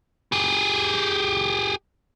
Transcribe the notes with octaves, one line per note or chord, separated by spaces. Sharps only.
G4 G#4